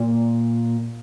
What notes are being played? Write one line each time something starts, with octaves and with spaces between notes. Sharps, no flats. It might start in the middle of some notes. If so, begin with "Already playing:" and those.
Already playing: A#2